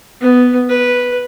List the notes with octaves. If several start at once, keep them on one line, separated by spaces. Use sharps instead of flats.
B3
B4